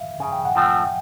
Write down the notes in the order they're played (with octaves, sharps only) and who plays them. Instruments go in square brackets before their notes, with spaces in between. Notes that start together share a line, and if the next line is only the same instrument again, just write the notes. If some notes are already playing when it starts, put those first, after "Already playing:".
Already playing: [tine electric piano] E5 F5
[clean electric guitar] C#3 [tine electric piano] G#5
[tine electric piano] G5
F#5
[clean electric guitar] F3 A3 C4 [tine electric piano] G5